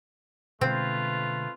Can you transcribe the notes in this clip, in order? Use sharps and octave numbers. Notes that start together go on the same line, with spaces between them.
B2 D3 G#3 A3 C4 F4 B4